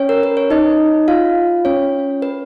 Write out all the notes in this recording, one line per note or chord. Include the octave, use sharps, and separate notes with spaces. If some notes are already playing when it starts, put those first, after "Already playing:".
Already playing: C#4 C#5
A#4
B4
C#5
D#4 D#5
F4 F5
C#4 C#5
B4